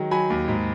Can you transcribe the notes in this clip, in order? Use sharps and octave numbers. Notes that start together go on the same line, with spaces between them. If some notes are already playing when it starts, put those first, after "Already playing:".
Already playing: D#3 F#3 G#3
F#3 G#5 B5
D#2
G#2